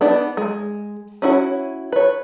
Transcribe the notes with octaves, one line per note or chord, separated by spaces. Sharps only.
B3 D4 D#4 D5
G#3
C#4 E4 F#4 C#5
B4 C#5